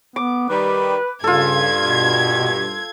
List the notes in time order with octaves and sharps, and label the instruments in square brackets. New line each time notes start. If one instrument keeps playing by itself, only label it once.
[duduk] B3 [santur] D6
[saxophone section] D#3 G3 [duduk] B4
[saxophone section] G2 [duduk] C#3 [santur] F4 A4 [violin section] G#6
[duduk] B2